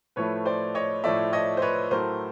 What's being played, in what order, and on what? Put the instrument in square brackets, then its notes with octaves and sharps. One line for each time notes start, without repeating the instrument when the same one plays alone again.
[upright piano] A2 F3 A3 B4 C#5
C5 D5
C#5 D#5
A2 F3 A3 D5 E5
C#5 D#5
C5
B4 C#5
A2 F#3 A3 A#4 C5